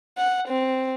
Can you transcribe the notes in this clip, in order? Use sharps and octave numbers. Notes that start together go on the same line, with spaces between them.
F#5
C4